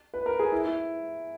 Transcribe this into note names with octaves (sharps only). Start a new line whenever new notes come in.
B4
A#4
G#4
E4
E4